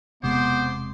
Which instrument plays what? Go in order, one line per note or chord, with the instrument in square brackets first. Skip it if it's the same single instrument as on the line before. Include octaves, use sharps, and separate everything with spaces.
[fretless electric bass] E1 C3 G#3 [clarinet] B3 [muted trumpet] C5 [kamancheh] C6 D6